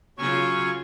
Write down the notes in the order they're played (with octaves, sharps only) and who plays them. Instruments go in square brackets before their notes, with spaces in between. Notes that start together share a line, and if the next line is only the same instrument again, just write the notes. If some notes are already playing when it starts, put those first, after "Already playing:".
[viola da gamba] C#3 F4 [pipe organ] F#3 C#4 G#5 [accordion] C#6